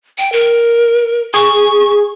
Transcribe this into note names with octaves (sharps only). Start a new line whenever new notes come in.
G5
A#4
G#4 C#6